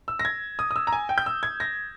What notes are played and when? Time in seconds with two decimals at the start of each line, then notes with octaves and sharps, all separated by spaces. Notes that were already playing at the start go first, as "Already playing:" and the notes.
0.08 E6
0.19 A#6
0.25 G#6
0.59 D#6
0.71 D#6
0.76 E6
0.87 A#5
0.93 G#5
1.09 G5
1.18 G6
1.26 E6
1.43 G#6
1.60 A#6